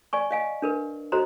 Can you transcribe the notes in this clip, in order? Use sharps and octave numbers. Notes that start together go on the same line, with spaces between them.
D5 G#5 C#6
D#5 F5 G#5
D4 A#4 B4
F#4 A4 C5 D#5 A#5 C6